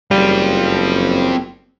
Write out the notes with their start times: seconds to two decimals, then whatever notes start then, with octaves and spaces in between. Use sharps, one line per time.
0.11 F#1 G3 C4 F4